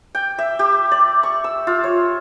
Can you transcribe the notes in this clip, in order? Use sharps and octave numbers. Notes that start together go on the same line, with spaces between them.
G5
E5
G4
D5
C#6
E6
F4
C#5